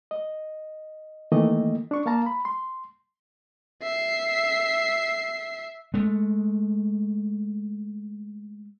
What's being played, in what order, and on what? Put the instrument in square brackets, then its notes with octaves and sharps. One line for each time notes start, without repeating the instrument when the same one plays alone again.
[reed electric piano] D#5
D#3 E3 A3 A#3 D#5
D4 C#6
A#3 F5 A5 A#5
B5
C6
[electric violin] E5 C7
[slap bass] G#3 A3